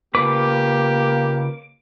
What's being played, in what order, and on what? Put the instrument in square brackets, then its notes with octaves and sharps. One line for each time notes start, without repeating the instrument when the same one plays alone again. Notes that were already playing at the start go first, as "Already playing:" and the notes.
[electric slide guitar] C#3 F4 B4 [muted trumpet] A#3 [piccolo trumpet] G4 [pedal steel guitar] D6